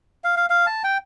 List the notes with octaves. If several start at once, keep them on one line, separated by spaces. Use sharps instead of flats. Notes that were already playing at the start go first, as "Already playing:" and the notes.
F5
F5
F5
A5
G5